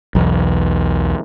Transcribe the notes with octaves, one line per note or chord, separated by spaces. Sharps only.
B1 E2